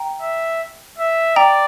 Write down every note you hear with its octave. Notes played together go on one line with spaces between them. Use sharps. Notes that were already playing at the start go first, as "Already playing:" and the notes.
Already playing: G5 A#5
E5
E5
D5 G5 A#5